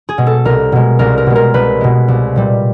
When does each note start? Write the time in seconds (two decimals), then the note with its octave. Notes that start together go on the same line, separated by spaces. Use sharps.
0.09 G#4
0.18 B2 G#3
0.27 A4
0.45 C2 A#4
0.72 B2 G#3
0.99 C2 A#4
1.18 A#4
1.26 B2 G#3
1.35 A#4
1.54 C2 B4
1.81 B2 G#3
2.08 C2
2.36 A#2 G3